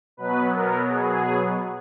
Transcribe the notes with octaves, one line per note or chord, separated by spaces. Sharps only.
B2 F#3 B3 B4
A#4
G#4